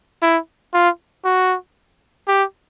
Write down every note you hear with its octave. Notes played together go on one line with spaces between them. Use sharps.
E4
F4
F#4
G4